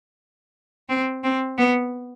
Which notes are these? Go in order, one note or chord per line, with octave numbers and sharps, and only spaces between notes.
C4
C4
B3